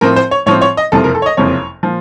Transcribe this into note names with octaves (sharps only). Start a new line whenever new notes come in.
A2 F3 C4 A#4
C5
C#5
A2 F3 C4 C#5
C#5
D#5
F#1 F2 C3 F3 A4
A#4
A4
C#5
D#5
F#1 F2 C3 F3 C#5
A#2 F3